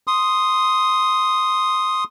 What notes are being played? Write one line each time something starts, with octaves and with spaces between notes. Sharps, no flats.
C6 D#6